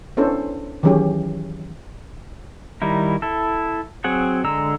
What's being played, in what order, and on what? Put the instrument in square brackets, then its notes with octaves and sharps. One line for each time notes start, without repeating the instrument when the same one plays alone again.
[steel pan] B3 C#4 D4 E4 A4 C5
D#3 E3 F#3 C#4 G4 G#4
[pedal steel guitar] D#3 G3 D#4 E4
E4 A4
F#3 C4 G#4 F#5
D3 G#3 A#5 E6